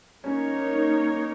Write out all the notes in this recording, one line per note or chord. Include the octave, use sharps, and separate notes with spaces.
A#3 C#4 D#4 A#4 C#5